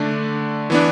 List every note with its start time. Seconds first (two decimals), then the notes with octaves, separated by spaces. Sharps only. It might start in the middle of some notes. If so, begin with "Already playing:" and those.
Already playing: D3 A3 D4
0.70 E3 B3 D4